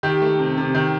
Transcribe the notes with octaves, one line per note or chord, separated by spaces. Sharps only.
D#3 G4
A3
C3
C3
D#3